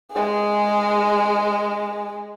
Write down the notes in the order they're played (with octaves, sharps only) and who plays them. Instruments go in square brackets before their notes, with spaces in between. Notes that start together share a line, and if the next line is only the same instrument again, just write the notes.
[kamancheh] G#3 G#4